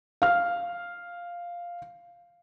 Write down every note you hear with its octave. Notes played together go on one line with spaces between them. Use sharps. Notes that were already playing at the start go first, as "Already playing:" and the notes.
F5 F6